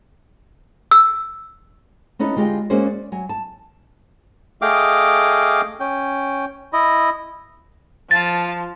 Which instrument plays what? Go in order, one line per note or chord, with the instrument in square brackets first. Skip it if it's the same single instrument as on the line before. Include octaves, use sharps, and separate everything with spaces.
[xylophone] E6
[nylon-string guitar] B3 C#4 D#4 E4 A4 B4
D3 G#3 F4 G4 D#5 G5
G#3 A#3 C#4 F#4 G#4 C5
D5
F#3 G#5
A5
[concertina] A3 G#4 D#5 F5 G5 D6
C#4 G5
E4 D#5
[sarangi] F3 [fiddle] F4 A5 [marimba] A6